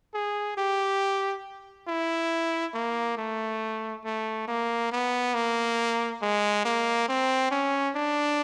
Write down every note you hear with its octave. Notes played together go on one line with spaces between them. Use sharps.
G#4
G4
E4
A#3
A3
A3
A#3
B3
A#3
G#3
A#3
C4
C#4
D4